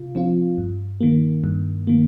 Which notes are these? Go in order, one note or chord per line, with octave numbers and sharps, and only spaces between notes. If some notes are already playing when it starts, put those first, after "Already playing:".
Already playing: C3 F4
F3 C4 F4
G2
D#3 A#3
G2
D#3 A#3